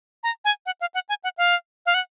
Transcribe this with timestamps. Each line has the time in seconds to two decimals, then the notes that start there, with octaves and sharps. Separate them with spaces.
0.23 A#5
0.45 G#5
0.66 F#5
0.81 F5
0.94 F#5
1.09 G#5
1.24 F#5
1.38 F5
1.86 F5
1.94 F#5